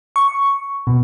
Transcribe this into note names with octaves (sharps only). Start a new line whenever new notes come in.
C#6
B2